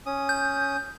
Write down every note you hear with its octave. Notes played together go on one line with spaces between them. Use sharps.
C#4 D#6
G6